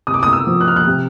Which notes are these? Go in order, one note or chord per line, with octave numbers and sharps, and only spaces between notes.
C3 D#6
D6
D#6
E6
F3
F#6
F6
F#6
C3